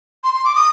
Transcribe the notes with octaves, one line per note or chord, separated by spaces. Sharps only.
C6
C6
D6
D#6